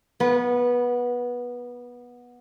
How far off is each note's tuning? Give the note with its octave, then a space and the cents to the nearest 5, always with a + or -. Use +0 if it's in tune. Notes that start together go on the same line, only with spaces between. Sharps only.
B3 -15 B4 -40